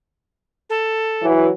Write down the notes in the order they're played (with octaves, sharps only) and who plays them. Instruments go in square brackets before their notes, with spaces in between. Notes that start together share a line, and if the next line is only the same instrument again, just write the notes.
[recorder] A4
[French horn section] E3 F#3